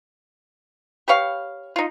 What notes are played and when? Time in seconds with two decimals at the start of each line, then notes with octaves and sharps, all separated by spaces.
1.08 G4 B4 C#5 F5
1.76 D#4 F4